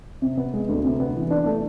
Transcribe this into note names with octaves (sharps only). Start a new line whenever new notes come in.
C3
B3
G#3
D2
C3
B3
E3
D4
A3